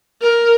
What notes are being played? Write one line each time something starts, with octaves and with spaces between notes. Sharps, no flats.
A#4